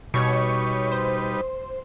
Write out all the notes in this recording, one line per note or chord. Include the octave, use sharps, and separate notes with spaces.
B2 G3 D#4 B4 C#5 C#6
C5